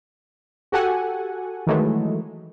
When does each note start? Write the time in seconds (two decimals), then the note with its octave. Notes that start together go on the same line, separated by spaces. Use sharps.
0.72 F#4 G4 A4 F#5 G#5
1.67 D#3 E3 F#3 G#3 A3